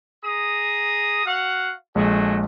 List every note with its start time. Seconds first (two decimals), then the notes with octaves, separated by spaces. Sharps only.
0.24 G#4 A#5 D#6
1.26 F#4 F5 F#5
1.95 A#1 G#3 A3 F#4 G#4